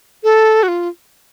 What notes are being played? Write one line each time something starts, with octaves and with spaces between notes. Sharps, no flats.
A4
F#4
F4